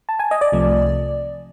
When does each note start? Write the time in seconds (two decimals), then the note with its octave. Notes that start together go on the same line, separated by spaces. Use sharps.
0.09 A5
0.19 G#5
0.31 D#5
0.41 D5
0.52 C2 C3 F3 A3